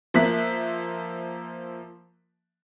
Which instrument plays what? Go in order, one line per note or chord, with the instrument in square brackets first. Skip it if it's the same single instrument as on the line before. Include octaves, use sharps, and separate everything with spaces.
[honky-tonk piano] F3 A#3 E5 F#6 B6